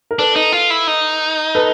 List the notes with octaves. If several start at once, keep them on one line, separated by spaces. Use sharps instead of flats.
A#4
D4 A4 B4
D#4
F4
E4
D#4
A4 B4